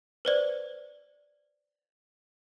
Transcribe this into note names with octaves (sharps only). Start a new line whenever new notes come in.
B4 C5 D5